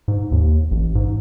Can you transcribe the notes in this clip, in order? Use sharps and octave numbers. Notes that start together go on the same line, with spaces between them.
G#2
D#2
A1
G#2